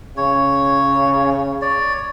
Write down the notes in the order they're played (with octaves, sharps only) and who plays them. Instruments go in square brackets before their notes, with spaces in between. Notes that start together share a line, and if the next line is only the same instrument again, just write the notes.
[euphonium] C#3 [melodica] C#5
[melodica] C#5 D5